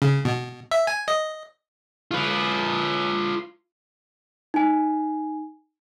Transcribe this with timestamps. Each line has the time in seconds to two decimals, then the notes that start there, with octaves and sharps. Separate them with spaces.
0.02 C#3
0.25 B2
0.71 E5
0.87 G#5
1.08 D#5
2.11 F4 B4
4.54 D#4 G#5